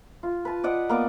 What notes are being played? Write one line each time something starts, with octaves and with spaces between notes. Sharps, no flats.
F4
B4 A5
D5 D#5 F#5
A#3 B3 D5